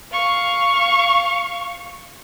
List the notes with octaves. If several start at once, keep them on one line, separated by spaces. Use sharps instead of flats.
F5 C#6